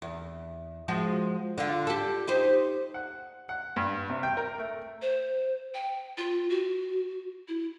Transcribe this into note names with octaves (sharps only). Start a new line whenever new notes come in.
E2
F3 G#3 F#4
D3 F4
G4 A4
D#4 G4 C5
F#5
F#5
G2
C3
G5
A#4
A3
C5
G5
F4
F#4
E4